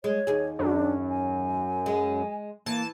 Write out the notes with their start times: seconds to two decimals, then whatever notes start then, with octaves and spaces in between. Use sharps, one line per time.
0.04 G#3 C#5
0.27 D#2 G#4
0.59 F#2 D4
1.09 G#5
1.86 G#3
2.66 E3 A#3 A5